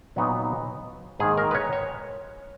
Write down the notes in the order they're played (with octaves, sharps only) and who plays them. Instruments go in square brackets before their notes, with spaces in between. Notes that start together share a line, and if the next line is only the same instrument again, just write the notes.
[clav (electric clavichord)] A#2 F#3 B3 D#4
G#2 D#3 A#3 D#4 G#4
A#4
B4
C#5
C#5